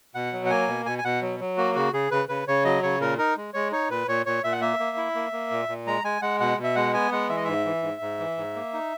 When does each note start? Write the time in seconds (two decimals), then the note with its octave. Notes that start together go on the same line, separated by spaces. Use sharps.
0.15 B2 F#5
0.33 F#3
0.46 F#5
0.50 A#3 G#5
0.68 B2
0.86 B2 G#5
0.98 G#5
1.04 B2 F#5
1.22 F#3
1.40 F#3
1.57 A#3 F#4
1.75 C#3 F#4
1.93 C#3 G#4
2.11 C#3 B4
2.29 C#3 B4
2.48 C#3 C#5
2.64 F#3 D#5
2.83 C#3 C#5
3.00 A#2 A#4
3.18 D#4 A#4
3.37 G#3
3.54 G#3 C#5
3.72 D#4 C#5
3.90 A#2 B4
4.08 A#2 C#5
4.26 A#2 C#5
4.44 A#2 E5
4.52 F#5
4.61 A#3 E5
4.80 A#3
4.97 E4
5.15 A#3
5.32 A#3
5.51 A#2
5.69 A#2
5.87 G#3 A#5
6.04 G#3 G#5
6.22 G#3 F#5
6.40 B2 F#5
6.58 B2
6.64 E5
6.76 G#3 F#5
6.93 B3 G#5
7.12 G#3 F#5
7.29 E3 E5
7.37 D#5
7.44 G#2 E5
7.65 E3
7.83 G#2
8.01 G#2
8.19 E3
8.37 G#2
8.55 A#3
8.73 D#4